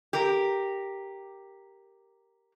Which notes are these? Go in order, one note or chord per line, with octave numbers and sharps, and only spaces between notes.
G4 A#4